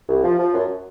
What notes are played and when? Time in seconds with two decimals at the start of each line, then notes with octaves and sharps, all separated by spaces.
0.09 C2
0.24 F3
0.39 F3
0.54 F#2